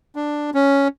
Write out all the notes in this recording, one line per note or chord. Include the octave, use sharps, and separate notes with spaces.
D4
C#4